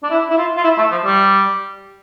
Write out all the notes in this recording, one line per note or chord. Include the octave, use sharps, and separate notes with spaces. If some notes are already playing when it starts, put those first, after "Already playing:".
D4
E4
E4
F4
F4
E4
A3
F3
G3